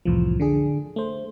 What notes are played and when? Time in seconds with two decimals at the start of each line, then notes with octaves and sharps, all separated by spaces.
0.05 C2 F2 A2 E3 F3
0.40 D3 D4 G#4
0.96 A3 C5